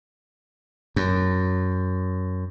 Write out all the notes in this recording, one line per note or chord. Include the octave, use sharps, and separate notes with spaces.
F#2